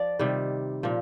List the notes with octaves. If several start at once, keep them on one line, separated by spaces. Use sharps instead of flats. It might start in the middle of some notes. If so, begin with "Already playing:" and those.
Already playing: F3 D5
C3 D#3 G3
A#2 F3